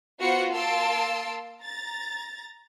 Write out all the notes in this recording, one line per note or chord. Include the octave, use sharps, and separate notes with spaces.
B3 F4 F#4 C5 F#5 C#7
A#3 F5 A5 C6 E6 D7
A#5 A6